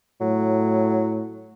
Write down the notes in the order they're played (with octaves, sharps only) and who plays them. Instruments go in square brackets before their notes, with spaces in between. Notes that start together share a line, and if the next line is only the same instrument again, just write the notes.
[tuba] A2 [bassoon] F#3